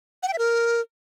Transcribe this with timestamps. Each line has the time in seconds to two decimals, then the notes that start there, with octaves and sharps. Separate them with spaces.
0.23 F#5
0.28 G5
0.33 E5
0.38 A#4